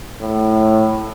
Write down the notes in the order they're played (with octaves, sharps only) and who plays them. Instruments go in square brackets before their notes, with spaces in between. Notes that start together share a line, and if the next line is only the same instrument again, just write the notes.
[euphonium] A2